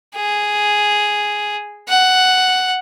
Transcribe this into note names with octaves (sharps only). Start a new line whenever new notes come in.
G#4
F#5